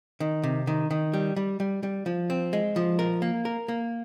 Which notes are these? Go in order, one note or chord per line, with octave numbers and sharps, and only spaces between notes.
D#3
C3
D#3
D#3
G3
G3
G3
G3
F3
C4
G#3
F3
A#4
A#3
A#4
A#3